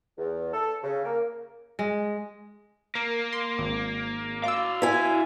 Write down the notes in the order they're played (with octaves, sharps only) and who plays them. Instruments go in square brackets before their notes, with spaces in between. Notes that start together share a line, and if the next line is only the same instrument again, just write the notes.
[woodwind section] E2
A4
C#3
A#3
[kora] G#3
[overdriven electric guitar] A#3 [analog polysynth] A#4
[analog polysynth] C6
G#1
[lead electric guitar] F#4 F5 [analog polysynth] D6 E6
[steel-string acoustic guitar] E4 G#5 [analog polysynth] B6